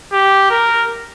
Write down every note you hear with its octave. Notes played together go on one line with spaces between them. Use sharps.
G4
A#4